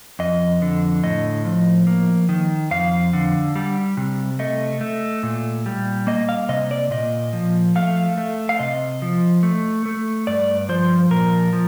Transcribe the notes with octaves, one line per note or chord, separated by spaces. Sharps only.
F2 D#5
D3
A2 D#5
F3
A#3
D#3
F2 F5
D3
G3
C3
A3 D#5
A3
A#2
G3
A#3 D#5
F5
C3 D#5
D5
A#2 D#5
F3
A3 F5
A3
F5
C3 D#5
F3
A3
A3
G2 D5
F3 C5
A#2 A#4
F3